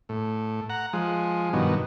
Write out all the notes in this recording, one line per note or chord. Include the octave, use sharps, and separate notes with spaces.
A2
F#5 A#5
F3 G#3
G2 B2 D#3 F#3